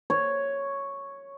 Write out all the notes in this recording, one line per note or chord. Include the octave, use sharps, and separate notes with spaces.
C#5